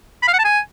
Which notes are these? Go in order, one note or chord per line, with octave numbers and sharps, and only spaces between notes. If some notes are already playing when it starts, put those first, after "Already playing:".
B5
F5
F#5
A5
G#5